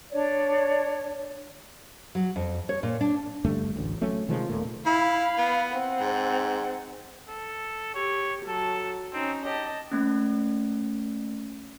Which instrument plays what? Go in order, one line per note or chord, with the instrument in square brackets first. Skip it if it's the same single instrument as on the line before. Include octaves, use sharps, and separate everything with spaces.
[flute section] D4 C#5 D5
[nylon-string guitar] F#3
F2
C#5
A#2
D4
[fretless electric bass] G2 D3 A3
A1 D2
F#3 A3 C#4
C3 D#3 F3 G#3
D#1 A#2 A3 A#3
[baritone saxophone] E4 [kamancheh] F5 B5
[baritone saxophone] B3
[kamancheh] C4 F#5
[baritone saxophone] G#2
[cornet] A4
[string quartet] G4 [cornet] C#5
[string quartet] F#3 A5 [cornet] A4
[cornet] C4 [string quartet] C#4 D#4
[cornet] G4 [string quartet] D#5 A5
[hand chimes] A3 A#3 C#4